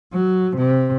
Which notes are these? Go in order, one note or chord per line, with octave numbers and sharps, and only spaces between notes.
F#3
C3